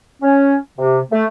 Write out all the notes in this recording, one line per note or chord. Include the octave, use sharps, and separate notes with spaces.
C#4
C3
A3